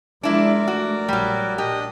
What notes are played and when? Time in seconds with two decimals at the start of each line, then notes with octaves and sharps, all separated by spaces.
0.23 F3 G#3 D4 E4 A#4 D5
0.68 A3 F#4
1.08 A#1 F#3 G3
1.58 D4 G4 D#5 D#6